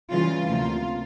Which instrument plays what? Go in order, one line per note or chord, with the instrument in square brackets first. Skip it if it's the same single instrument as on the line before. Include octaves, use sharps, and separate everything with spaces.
[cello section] C#3 E3 G3 F4
D2 C3 F3 A#3 F4